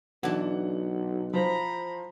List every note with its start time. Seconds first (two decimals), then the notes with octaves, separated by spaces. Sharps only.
0.23 B1 E3 D4 F#5
1.33 F3 C5 A#5 B5